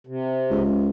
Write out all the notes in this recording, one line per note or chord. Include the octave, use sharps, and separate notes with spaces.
C3
C#2